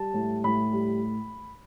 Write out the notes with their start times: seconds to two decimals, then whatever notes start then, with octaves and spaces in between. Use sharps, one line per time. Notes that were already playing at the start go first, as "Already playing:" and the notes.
Already playing: G3 A5
0.14 A2
0.44 A2 B5
0.72 G3